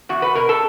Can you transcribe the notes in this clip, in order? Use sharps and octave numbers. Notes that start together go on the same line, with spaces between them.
E2 F#4
B4
B2 A#4
A4